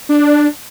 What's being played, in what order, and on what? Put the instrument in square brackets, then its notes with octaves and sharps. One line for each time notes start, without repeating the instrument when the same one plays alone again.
[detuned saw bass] D4